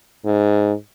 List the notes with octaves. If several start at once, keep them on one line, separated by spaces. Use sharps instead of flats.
G#2